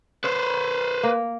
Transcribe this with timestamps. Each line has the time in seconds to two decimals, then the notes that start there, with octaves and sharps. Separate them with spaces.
0.24 B4 C5
1.03 A#3